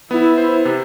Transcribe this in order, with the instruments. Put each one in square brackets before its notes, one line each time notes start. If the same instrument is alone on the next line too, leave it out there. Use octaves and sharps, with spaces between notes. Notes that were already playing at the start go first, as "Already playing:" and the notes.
[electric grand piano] B3 [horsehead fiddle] E4
[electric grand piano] C5
C3